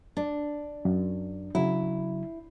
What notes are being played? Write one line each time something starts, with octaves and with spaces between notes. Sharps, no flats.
D4
F#2
C#3 F#3 E4